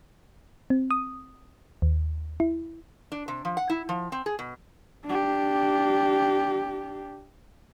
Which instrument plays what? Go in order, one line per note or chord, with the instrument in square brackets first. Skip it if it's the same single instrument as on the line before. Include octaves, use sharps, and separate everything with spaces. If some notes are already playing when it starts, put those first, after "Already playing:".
[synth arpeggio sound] C4
D#6
D#2
E4
[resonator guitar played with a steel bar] D4
C3
F3
F#5
E4
F3
C4
G#4
B2
[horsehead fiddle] D4 G4